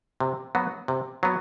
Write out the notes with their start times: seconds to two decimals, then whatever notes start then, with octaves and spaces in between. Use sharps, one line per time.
0.20 C3
0.55 F#3 B3 F#4
0.88 C3
1.23 F#3 B3